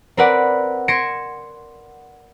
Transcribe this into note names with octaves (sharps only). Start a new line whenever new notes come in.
C4 A#4 B4 D5 F#5
C6 G#6 A#6 C#7 D7 E7